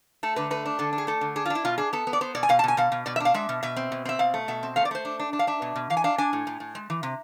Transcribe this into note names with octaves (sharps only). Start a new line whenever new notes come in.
A3 A4
D3 B4
A3 B4
D4
D3 A4
D4
G#4
A3 A4
D3
D4 G#4
F4
D4
E4
B2 F4
D4 G#4
B3 A4
B3
D5
B3 C5
B2 D5
G#5
B2 F5
A5
B2
G#5
B2 F5
B2
B2 D5
E5
D4 F5
G#3 E5
B2
B2 E5
C4
B2
C4 E5
B2 F5
A3
B2 E5
C4
A3 F5
D5
A3 C5
D4
D4
D4
F5
D4 E5
B2
B2
E3 F5
G#5
D4 F5
D4 G#5
A2
A2
A2
G#3
E3
C3